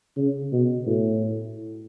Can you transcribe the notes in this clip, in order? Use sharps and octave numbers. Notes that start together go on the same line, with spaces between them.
C#3
B2
A2